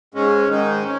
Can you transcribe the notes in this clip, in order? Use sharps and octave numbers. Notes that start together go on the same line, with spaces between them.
G#2 G#3 C#4
G#2 D#3 G#3 D#4
C#4